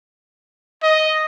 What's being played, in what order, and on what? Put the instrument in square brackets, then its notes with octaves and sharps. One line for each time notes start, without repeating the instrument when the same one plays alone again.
[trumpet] D#5